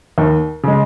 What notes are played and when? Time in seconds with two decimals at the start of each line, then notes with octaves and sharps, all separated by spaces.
0.18 D#2
0.63 C#3 G#3